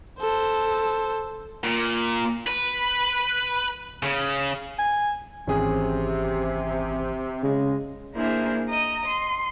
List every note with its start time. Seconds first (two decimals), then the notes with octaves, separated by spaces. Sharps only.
0.19 A4 C5
1.64 A#2
2.47 B4
4.03 C#3
4.79 G#5
5.47 G#1 C3 E3 C4 C#4 G#4
7.43 C#3 G#3
8.13 A#3 D4 E4 G#4 A#4 C5
8.69 D#5 A#5
9.08 C6